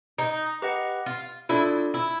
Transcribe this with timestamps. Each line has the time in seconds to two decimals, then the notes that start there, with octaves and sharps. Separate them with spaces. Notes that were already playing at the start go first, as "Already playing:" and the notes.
0.18 D#4
0.62 G4 B4 D#5 F#5
1.06 F4
1.49 D4 E4 F4 A4 D5
1.94 E4